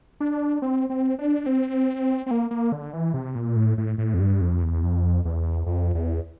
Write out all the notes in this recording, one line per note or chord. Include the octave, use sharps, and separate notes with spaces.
D4
C4
C4
D4
C4
C4
A#3
A#3
D3
E3
C3
A#2
A2
A2
A2
F2
G2
F2
E2
F2
E2
F2
E2